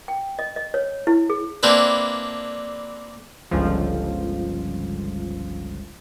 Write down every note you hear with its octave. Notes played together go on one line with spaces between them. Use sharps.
G5
D#5
D#5
C#5
E4
G#4
A#3 C4 D4 E4 B4
G1 C#2 F3